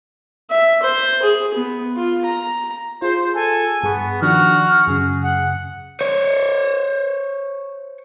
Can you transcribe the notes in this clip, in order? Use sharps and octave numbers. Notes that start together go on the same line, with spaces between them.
E5
C5
G#4
B3
F4
A#5
F4 G#4 C5
A4 G#5
G2 B3 G#4 C#6
D#3 F3 D4 F#4 F6
F#2 C#3 G#4
F#5
C5 C#5